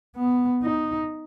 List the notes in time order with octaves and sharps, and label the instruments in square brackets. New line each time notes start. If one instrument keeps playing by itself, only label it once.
[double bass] B3
D#4